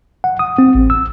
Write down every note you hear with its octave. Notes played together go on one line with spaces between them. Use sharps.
F#5
D#6
C4
A1
E6